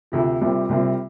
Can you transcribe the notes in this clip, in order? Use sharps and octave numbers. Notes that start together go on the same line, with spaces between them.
D2 C3 F3
C2 C3 G3 C4 F4
C2 C3 G3 C4 F4